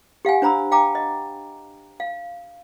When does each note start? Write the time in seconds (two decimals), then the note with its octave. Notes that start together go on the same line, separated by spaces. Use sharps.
0.25 G4 F5 F#5 G#5
0.42 D4 C5 A#5 B5 E6
0.72 F5 G5 A5 A#5 D6
0.95 D#5
2.00 F5